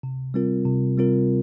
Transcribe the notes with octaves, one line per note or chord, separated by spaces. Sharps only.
C3
G3 C4 F4 A#4
C3
G3 C4 F4 A#4